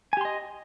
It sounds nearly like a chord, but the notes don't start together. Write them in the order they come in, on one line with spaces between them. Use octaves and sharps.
G#5 G4 C6 D#5